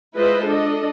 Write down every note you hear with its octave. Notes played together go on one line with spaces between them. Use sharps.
G#3 E4 F4 B4 C5 D#5
D4 A4 D#5